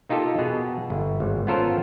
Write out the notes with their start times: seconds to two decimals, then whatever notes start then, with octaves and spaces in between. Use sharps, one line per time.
0.09 A#3 D#4 F4 G4 A4
0.39 B2 B3 G#4
0.90 G1
1.20 G#1
1.47 B3 C#4 F4 A4 A#4 C5